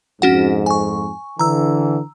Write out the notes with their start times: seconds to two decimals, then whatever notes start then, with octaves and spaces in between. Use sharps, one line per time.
0.22 F2 G#2 C#4 F#4 F#5
0.66 G#5 C#6
1.39 D3 E3 A#5 E6